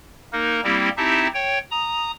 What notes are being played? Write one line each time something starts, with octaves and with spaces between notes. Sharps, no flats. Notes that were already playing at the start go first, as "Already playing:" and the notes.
A#3 D#4 A#4
G3 A#3 C4 E4 G4
C4 D#4 E4 G4 E5 A5
C#5 G5
A#5 D#6